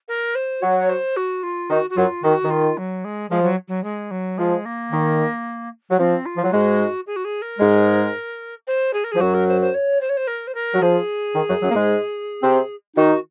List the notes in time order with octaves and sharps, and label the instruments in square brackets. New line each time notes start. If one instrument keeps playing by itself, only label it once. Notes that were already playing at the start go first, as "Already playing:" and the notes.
[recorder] A#4
C5
[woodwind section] F#3 F#4 [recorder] C#5
[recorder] C#5
C5
F#4
F4
[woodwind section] D#3 D#4 [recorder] F#4
[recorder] F#4
[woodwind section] F#2 F#3 [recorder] F4
[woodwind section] D#3 [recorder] F#4
[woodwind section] D#3
[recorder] F4
F#3
G#3
[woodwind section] F3 [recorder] G#3
[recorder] F#3
F#3
G#3
F#3
[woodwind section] F3 [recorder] G#3
[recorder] A#3
[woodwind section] D#3
F#3
[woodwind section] F3 [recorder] C4
[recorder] F4
[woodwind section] F3
F#3
[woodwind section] G#2 G#3 [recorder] F#4
[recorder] G#4
F#4
G#4
A#4
[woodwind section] G#2 G#3
[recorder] C5
G#4
A#4
[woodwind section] F3 [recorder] G#4
[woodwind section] F#2 F#3 [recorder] F#4
[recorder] A#4
C5
C5
C#5
C5
C#5
C5
A#4
C5
A#4
[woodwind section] F#3
[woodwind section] F3 [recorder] G#4
[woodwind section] D#3
F#2 F#3
F#2 F#3
A#3
G#2 G#3
C3 C4
[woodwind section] D#3 D#4 [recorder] F#4